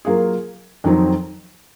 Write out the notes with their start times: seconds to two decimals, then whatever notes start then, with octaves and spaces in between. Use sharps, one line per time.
0.05 F#3 A#3 F4 G#4
0.84 F2 D#3 F#3 C4 D#4